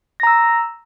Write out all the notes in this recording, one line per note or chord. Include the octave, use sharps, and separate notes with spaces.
A#5 E6 A#6